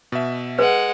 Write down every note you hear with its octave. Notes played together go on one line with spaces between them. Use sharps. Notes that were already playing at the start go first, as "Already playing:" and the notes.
B2 E5
G#3 B4 F#5